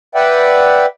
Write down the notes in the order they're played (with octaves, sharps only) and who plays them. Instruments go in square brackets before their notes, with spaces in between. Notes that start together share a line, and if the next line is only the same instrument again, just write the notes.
[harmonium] B4 D5 E5 F#5 G5